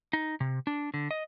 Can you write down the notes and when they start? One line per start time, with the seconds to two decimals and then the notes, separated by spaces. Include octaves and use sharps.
0.13 D#4
0.40 C3
0.67 D4
0.94 D3
1.11 D#5